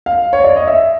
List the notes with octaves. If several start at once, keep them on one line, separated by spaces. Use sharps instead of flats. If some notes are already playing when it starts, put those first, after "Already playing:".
F5
C#5
D5
D#5
E5